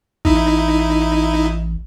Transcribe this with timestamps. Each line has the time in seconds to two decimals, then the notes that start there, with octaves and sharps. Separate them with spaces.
0.25 A1 D#4 E4